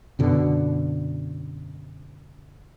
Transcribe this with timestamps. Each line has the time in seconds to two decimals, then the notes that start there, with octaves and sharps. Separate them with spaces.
0.19 F#2 B2 D3